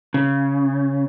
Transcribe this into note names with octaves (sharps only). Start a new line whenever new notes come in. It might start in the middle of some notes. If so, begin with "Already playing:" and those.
C#3